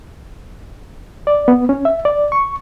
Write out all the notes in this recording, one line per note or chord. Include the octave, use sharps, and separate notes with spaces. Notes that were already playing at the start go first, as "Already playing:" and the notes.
D5
B3
C#4
E5
D5
C#6